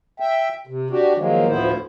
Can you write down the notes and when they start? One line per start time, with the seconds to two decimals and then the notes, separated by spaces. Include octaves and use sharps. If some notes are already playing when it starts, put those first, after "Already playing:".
0.20 E5 G5
0.67 C3
0.90 D4 F#4 G4
1.17 D#3 F3 F#3 G#3 A#3
1.47 D2 A2 F3 B3 E4 C5